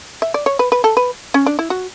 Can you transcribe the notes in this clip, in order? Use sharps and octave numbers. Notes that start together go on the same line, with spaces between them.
E5
D5
C#5
B4
B4
A4
B4
C#4
D4
E4
F#4